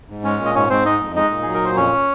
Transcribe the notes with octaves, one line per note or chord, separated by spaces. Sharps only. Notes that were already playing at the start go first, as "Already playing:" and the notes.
G#2
G#3 C#4 C#5
A#2
D#5
G#2 C#4 C#5
G#2 C4 C5
G#3 D#4 D#5
F2
G#3 D#4 D#5
A#2
F#3 G#4
A#4
A#2 C5
F2 C#4 C#5